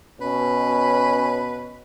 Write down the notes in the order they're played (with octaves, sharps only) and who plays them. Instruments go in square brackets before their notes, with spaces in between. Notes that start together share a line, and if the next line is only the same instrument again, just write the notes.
[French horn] B2 [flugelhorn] C#4 [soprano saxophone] B4